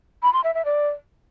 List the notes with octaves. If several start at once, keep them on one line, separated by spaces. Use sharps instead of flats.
B5
C6
E5
E5
D5